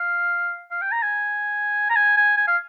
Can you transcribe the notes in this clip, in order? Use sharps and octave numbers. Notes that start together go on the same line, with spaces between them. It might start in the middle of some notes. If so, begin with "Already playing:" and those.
Already playing: F5
F5
G5
A#5
G#5
A#5
G#5
G#5
G#5
F5